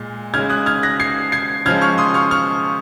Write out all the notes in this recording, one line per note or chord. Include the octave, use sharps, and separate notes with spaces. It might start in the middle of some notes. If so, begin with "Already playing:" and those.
Already playing: A#2 G#3
C#3 G#3 F6 G#6
D#6 F#6
F6 G#6
F#6 A#6
G#6 C7
G#6 C7
C#3 F3 G#3 F6 G#6
C#6 F6
C6 D#6
C#6 F6
C#6 F6